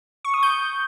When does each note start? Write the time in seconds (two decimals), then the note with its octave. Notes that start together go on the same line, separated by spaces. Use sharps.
0.25 C#6
0.34 D#6
0.43 G6